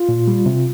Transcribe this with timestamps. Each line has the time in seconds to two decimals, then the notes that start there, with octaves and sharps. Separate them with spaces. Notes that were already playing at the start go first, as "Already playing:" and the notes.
Already playing: F4
0.09 A#2
0.28 G3
0.46 C3